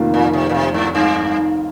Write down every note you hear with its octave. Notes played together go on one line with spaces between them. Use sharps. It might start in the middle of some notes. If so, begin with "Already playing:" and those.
Already playing: F1 F2 D#3 A#3 F4
A#2
C3
A#2
C3
G#2
G2